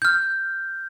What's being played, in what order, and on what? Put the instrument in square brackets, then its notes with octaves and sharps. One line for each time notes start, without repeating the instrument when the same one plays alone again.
[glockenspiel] F6 G6